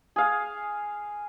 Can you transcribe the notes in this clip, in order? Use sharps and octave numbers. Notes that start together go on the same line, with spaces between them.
G#4 F5